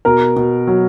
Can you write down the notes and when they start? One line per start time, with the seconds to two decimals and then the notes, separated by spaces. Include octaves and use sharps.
0.05 B2 A#4 A#5
0.36 B2
0.67 F#3